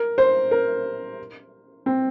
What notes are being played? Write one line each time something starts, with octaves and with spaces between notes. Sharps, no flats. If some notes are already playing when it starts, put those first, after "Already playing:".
Already playing: A#4
C5
A#4
C4